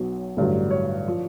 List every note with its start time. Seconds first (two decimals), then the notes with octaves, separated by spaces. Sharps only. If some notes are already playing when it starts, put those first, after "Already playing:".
Already playing: B1 B2 F#3
0.37 A1 G2 D3 F#3
0.71 C#5
1.08 F3